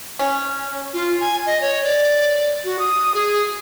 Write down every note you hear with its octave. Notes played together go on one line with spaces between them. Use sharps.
C#4
F4
G#5
D#5
C#5
D5
F#4
D#6
G#4